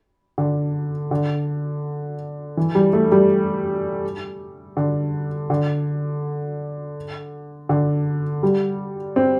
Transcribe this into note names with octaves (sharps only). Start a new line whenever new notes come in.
D3
D3
E3
G3
A3
G3
D3
D3
D3
G3
C4